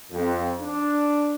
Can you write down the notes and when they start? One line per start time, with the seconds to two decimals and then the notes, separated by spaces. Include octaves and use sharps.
0.11 F2
0.60 D4